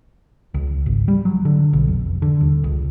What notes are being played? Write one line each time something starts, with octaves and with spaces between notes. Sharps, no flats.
C#2
G#1
G3
F#3
D3
B1
F1
D3
D#1
C#2